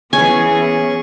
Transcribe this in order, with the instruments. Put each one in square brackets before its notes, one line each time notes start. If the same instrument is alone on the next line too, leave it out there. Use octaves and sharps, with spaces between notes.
[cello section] E3 B3 [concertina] C#4 C#6 [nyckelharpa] G#4 [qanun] G#5